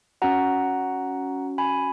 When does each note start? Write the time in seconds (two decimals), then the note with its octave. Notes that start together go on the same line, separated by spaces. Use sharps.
0.22 C#4 F#4 F#5 A#5
1.58 G#5 B5